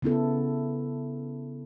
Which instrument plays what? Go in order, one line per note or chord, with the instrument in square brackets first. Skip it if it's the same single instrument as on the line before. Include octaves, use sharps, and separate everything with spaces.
[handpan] C#3 B3 E4 A4